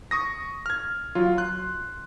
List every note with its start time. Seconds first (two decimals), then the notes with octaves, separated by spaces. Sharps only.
0.11 C#6 D#6 A#6
0.66 F6 G#6
1.15 F#3 F4
1.37 C6 F#6